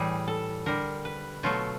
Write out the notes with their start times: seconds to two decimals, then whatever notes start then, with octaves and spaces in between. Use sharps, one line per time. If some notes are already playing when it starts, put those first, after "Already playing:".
Already playing: A2 E3 G3 G#4
0.28 A4
0.66 D3 G3 A#4
1.05 B4
1.43 B2 F#3 A3 F4